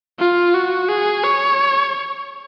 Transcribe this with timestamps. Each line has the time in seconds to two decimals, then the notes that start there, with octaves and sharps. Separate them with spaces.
0.19 F4
0.54 F#4
0.89 G#4
1.24 C#5